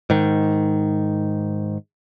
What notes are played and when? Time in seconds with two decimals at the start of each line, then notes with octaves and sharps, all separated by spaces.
0.10 G#2 D#3